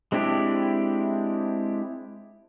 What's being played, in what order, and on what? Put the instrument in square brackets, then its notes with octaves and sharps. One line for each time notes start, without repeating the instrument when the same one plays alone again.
[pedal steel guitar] G#3 C4 D4 E4 G4